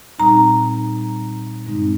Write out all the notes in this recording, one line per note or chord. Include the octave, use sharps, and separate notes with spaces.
A#2 G3 C4 D#4 A#5
G2 D3 G#3 C4 D#4